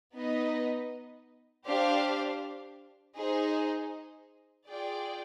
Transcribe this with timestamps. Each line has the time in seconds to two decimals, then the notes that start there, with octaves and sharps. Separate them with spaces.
0.14 B3 D#4 B4 D#5
1.66 D4 G4 C5 F5
3.17 D#4 G#4 C5
4.68 F4 G#4 D5 G5